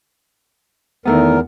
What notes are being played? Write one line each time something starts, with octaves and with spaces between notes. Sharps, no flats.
E2 D#3 A3 B3 A#4